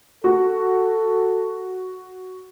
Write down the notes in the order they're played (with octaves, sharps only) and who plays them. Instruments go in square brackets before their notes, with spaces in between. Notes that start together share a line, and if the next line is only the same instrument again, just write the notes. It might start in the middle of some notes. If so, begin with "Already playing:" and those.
[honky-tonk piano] F#4 [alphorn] A4